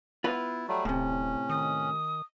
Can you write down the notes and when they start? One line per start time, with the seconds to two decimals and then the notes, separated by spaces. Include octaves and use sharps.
0.24 B3 E4 F4 B4
0.68 F#3 G3 A3
0.85 D1 A2 C3 C#4
1.49 D#3 D#6